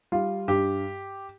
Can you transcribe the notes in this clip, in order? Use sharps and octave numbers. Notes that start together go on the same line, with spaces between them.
G3 F4
G2 G4